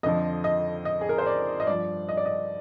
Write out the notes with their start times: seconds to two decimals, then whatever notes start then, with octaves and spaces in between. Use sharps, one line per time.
0.03 F2 D3 F3 D#5
0.44 D#5
0.85 D#5
1.01 G#4
1.09 A#4
1.18 C5
1.27 D5
1.60 D#5
1.67 G2 F3 D5
2.09 D#5
2.17 D5
2.25 D#5